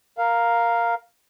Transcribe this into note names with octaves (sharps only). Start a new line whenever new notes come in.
A#4 F5